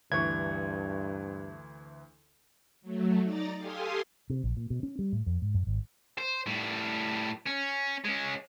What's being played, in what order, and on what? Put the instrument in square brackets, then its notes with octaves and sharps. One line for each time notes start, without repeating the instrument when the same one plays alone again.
[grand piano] D2 E3 C#6 [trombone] G2 [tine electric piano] G#6
[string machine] F#3 A3
D#4 D5 A#5 A6
G4 A4 F5 G#5 C6 D#6
[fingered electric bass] C3
A#1
A#2
B2
C#4
G3
A2
F2
G#2
F#2
G#1
[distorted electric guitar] C5
A2 G3
C#4
G#3 C#4